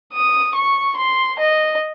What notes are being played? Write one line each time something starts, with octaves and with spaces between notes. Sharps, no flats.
D#6
C#6
C6
D#5